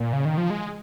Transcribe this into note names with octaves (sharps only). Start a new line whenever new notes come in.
A#2
C#3
D#3
F3
G#3